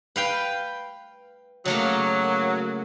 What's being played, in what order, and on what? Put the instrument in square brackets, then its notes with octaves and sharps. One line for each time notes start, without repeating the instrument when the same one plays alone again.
[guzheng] B4 F5 G5
[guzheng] C#3 A3 A#3 [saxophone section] F#3